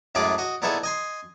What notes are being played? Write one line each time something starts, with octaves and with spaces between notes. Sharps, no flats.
F#2 A2 G#3 F4 G#4 D6
F#4 D#5
A#2 B3 D#4 E4 G#4 A4
D#5 G#5 C6